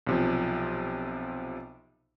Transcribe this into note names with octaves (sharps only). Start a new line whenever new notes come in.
B1 C3 F3